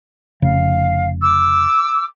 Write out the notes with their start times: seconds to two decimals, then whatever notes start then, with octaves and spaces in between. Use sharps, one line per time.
0.42 F1 C#3 F5
1.22 D6 E6